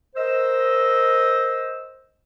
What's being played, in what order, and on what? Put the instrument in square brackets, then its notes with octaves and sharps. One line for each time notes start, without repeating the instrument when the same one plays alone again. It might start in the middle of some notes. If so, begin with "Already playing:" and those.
[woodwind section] A#4 C5 D#5 E6